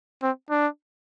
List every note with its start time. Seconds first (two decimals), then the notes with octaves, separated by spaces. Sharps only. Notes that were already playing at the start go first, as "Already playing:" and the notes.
0.22 C4
0.50 D4